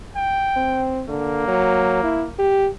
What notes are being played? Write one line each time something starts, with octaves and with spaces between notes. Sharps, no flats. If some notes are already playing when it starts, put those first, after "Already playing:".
G5
C4
D3 A#3
F#3
E4
G4